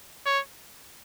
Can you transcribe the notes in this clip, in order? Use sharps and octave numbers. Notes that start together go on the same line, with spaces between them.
C#5